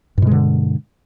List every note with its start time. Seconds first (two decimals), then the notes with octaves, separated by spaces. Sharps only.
0.18 G2
0.22 B2
0.27 G#3
0.31 D3